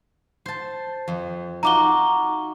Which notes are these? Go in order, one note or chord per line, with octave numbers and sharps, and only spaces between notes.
C5 A5
F2
D#4 F4 F#4 A#5 D6 G7